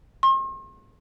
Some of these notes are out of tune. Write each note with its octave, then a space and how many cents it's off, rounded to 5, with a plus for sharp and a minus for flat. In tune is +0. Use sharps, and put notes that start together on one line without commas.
C6 +45